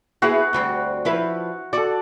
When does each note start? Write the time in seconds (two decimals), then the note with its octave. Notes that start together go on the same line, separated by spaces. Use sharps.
0.22 B3 E4 F#4 G#4
0.53 D2 G3 C4
1.05 F3 E4 B4
1.73 F#4 A4 D5